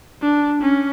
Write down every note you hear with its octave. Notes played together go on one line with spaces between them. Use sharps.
D4
C#4